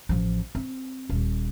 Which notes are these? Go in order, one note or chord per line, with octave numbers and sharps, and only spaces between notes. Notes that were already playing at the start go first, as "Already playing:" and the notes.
A1 F3
C4
D#1